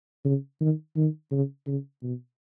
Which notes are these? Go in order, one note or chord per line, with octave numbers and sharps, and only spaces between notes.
C#3
D#3
D#3
C#3
C#3
B2